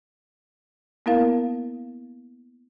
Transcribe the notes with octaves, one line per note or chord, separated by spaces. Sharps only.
A#3 B3 E4 A#4 F5